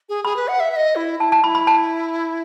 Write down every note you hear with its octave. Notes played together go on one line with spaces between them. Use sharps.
G#4
G#4 B5
B4
F#5
E5
E5
D#5
E4
E4 A5
A5
E4 B5
B5
A5